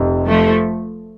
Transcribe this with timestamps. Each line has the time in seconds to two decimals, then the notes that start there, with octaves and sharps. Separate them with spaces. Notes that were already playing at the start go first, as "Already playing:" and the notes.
Already playing: F1 F2 C3
0.26 F3 A3